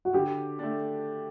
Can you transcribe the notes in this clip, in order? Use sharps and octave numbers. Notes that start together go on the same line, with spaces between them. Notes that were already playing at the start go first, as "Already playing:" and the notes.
F#4
D3 G4
A3 D4